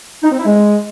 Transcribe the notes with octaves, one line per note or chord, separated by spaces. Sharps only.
D#4
C4
E4
G#3